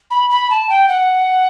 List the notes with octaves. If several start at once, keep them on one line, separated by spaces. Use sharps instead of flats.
B5
B5
A5
G5
F#5